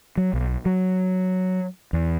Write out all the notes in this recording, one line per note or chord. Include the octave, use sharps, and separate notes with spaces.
F#3
B1
F#3
E2